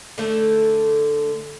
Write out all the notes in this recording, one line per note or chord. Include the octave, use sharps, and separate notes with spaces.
D3 A3